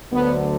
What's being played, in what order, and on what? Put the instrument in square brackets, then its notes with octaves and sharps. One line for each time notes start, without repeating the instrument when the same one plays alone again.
[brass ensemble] D2 D3 F#3 B3